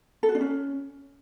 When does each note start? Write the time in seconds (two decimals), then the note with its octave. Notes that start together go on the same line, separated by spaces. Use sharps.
0.23 A4
0.29 F#4
0.35 D4
0.41 C#4